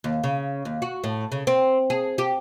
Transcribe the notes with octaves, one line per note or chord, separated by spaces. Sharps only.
D#2
C#3
D#2
F#4
A2
C#3
C4
G#4
G4